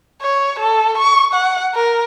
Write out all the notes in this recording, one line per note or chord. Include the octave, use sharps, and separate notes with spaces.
C#5
A4
C#6
F#5
A#4